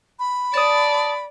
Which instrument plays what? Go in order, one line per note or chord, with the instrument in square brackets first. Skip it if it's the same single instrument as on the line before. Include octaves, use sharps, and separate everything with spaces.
[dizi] B5
[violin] D5 [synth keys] A5 D#6